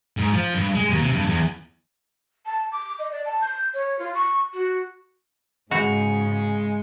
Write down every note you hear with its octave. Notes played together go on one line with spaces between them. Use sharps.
G#2
F3
G2
G#3
D#2
C3
G2
E2
A5
D6
D#5
D5
A5
G6
C#5
F4
C#6
F#4
G#2 C#3 G#3 F#4 B5 G6 C#7